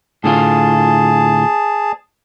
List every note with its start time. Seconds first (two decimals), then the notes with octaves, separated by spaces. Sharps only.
0.24 A2 D3 F4 G#4 A5